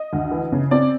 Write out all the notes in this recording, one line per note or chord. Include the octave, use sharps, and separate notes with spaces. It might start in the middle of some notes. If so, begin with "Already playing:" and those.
Already playing: D#5
D2
E3
C#3
C4 D5